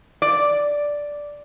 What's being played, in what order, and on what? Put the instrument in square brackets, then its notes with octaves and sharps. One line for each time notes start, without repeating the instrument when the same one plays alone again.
[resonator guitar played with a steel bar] D5